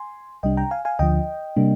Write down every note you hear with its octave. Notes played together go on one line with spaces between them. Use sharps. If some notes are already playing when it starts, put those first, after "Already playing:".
Already playing: G#5 C6
C2 C3 G3 D4 D#5 G5
G5 A#5
F5 G#5
F5 G#5
D2 D3 F3 D#5 G5
C3 G3 A#3 D4